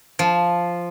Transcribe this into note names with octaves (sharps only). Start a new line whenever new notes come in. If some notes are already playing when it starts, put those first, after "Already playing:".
F3